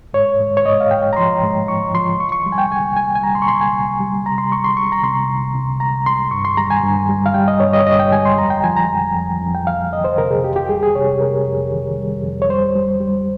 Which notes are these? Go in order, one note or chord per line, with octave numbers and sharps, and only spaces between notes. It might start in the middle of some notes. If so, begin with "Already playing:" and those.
G#2 C#5
G#2
C#5
G#2 D#5
F5
G#2 G5
A#5
F3 C6
G#2
G#2 C#6
F3 C6
C2 C#6
C#6
G3
G#5
G5
C2 G#5
C2 G#5
G#5
G3 A#5
C6
C#6
C2 C6
G#5
C2
G3
C3 A#5
C6
C2 C#6
C6
C2 C#6
A#5
C3 C6
C2
C2
C2 A#5
C2 C6
G2 C#6
C6
G3 A#5
G#5
G2
G3
F5
G3 G5
D#5
G2 C#5
D#5
C#5
G2 D#5
G5
G3 G#5
C6
F2 A#5
G5
F3 G#5
A#5
F2
F2
F2
G5
F2 F5
F2 D#5
C5
C3 A#4
G#4
F2 G4
G4
G3 G#4
G#4
C3 C#5
C3 A#4
F2
D#3
G3
F2
C#5
G3 C5
G3
G3